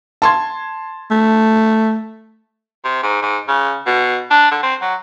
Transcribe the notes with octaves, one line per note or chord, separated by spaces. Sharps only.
A5 C6 G#6
A3
C3
G#2
G#2
C#3
B2
D4
D3
C4
F#3